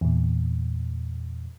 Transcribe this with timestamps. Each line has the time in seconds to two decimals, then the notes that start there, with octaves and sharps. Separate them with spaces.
0.01 E2 A#2